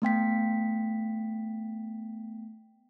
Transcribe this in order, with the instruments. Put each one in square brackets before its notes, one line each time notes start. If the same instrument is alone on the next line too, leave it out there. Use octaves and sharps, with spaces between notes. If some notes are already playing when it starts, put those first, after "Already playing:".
[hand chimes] A3 B3 G5 B6